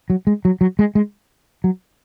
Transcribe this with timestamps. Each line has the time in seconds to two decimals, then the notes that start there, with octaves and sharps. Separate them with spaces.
0.10 F#3
0.27 G#3
0.45 F#3
0.61 F#3
0.79 G#3
0.95 G#3
1.64 F#3